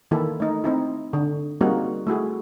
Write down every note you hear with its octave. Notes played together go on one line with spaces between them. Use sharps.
D#3 E3 A#3 E4 A4
A3 D#4
C4 D#4 E4
D3
G3 A#3 C4 D#4 F#4 G#4
A3 E4 F#4 G#4